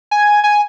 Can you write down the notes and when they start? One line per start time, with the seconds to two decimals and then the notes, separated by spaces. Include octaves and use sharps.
0.11 G#5
0.44 G#5